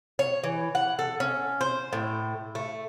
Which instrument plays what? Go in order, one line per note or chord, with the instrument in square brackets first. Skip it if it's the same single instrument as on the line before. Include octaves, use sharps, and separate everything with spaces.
[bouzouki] C#5
E3
F#5
A4
C#4
C5
A2
A3